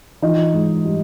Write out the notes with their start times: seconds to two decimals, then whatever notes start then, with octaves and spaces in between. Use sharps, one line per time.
0.22 E3 D#4 F4
0.53 G#2
0.85 G3